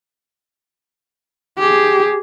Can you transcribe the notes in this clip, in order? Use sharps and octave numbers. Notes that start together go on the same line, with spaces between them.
G4 G#4